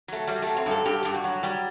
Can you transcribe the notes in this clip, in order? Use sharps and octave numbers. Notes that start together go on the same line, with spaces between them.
F#3 A3
F#3 G3
F#3 A3
C4
G2 A4
G2 G4
G2 G4
F#4
F#3
G3 G4